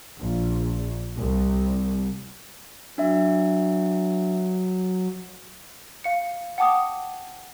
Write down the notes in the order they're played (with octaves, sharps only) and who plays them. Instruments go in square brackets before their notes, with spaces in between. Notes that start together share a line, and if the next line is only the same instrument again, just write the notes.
[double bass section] A#1
C2
[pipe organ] F#3 [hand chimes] D4 E5
[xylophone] F5 C#7
F#5 G5 A5 D6 D#6